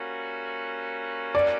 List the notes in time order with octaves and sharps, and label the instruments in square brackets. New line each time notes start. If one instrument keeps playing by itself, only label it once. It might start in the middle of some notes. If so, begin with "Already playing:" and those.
Already playing: [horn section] G3 A#3 C#4 F#4
[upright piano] D5